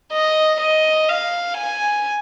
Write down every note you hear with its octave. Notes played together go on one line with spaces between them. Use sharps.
D#5
D#5
F5
G#5